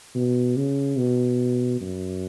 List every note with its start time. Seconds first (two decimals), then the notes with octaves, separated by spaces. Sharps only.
0.15 B2
0.56 C#3
0.98 B2
1.81 F#2